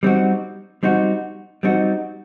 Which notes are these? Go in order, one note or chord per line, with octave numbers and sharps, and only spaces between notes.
G3 C4 D#4 F#4
G3 C4 D#4 F#4
G3 C4 D#4 F#4